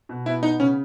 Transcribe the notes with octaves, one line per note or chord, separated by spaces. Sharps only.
B2
B3 E4
B3 D#4
C#3 C#4